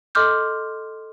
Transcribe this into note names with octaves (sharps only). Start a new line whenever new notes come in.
A4 D#5 C6 D6 F6 G6